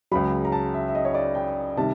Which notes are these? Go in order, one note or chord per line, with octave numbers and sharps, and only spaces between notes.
C#2 C#3 F#3 B5
A#5
A5
E5
E5
D#5
C#5
D5
G5
C3 D#3 G3 A5